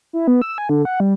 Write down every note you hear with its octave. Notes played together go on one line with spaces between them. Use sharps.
E4
B3
E6
G#5
D3
F#5
G3